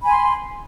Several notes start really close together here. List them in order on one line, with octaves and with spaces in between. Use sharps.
B5 G#5 C6